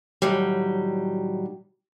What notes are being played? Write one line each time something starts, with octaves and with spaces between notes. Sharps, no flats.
A2 D#3 F#3 G3